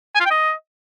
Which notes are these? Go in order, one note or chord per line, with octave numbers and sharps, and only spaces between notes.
G#5
F4
G5
D#5